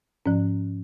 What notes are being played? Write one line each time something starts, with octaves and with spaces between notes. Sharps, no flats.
G#2 F3 C#4